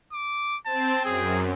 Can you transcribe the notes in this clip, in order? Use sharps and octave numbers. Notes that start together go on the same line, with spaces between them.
D6
C4 A5
F#2 G#4